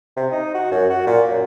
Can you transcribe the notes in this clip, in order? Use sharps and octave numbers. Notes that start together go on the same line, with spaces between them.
C3
D#4
F#4
F#2
F#4
A#2
F#2